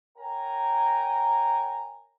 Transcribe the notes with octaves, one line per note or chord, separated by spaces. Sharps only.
A#4 C#5 G5 G#5 A#5